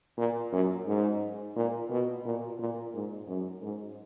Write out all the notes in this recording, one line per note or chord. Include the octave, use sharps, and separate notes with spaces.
A#2
F#2
G#2
A#2
B2
A#2
A#2
G#2
F#2
G#2